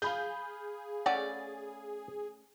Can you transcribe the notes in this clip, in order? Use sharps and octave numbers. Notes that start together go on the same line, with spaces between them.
G#4 F5 B5 G6
A3 C#4 D5 F#5